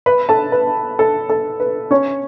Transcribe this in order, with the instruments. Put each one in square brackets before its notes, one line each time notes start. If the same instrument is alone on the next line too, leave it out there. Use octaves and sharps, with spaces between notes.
[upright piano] B4 B5
A4 A5
B4
A4
A4
B4
C#4 C#5